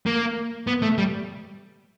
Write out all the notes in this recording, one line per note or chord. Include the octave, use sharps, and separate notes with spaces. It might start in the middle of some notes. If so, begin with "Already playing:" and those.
A#3
B3
A3
G3